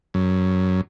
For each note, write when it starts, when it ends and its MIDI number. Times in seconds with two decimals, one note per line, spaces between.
0.14 0.81 42